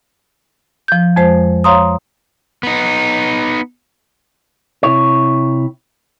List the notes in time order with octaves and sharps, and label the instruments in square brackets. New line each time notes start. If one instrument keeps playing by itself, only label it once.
[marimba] F3 G6
F2 G#3 C5
C#5 F5 A#5 C6 D#6
[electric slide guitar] B3 D#4
[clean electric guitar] C3 E4 C#5